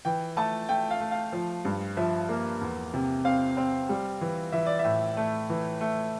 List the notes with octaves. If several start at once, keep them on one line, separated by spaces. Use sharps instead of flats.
E3 G5
A3 A5
A3 G5
F5
A3
F5
F3
G2
F3 E5
A#3
E2
C3
C4 F5
C4
G3
E3
E3 E5
D5
E5
A2
A3
E3
A3